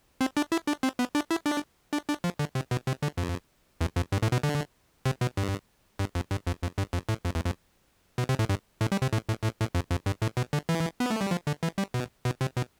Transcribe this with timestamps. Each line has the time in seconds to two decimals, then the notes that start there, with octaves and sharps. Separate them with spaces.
0.21 C4
0.37 D4
0.52 E4
0.67 D4
0.83 C4
0.99 B3
1.15 D4
1.31 E4
1.46 D4
1.93 D4
2.09 D4
2.24 F3
2.39 D3
2.55 C3
2.71 B2
2.87 C3
3.02 D3
3.18 F2
3.81 E2
3.96 F2
4.12 G2
4.22 A2
4.32 B2
4.43 D3
5.06 C3
5.21 B2
5.37 G2
5.99 G2
6.15 F2
6.31 G2
6.47 F2
6.62 F2
6.78 G2
6.93 F2
7.09 A2
7.25 F2
7.35 E2
7.45 F2
8.18 B2
8.29 C3
8.39 A2
8.49 G2
8.81 A2
8.92 G3
9.02 C3
9.13 A2
9.28 A2
9.44 A2
9.60 A2
9.75 F2
9.91 F2
10.06 G2
10.22 A2
10.37 B2
10.53 D3
10.69 E3
11.00 B3
11.10 A3
11.21 G3
11.31 F3
11.47 D3
11.63 E3
11.78 G3
11.94 B2
12.25 B2
12.41 C3
12.57 B2